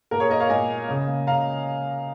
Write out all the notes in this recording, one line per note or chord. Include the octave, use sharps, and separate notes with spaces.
A#2 A#4
G#4 C#5
A#3 A#4 D#5
C#5 F5
A#2 D#5 G#5
A#3
C#3
A#3
C#3 F5 A#5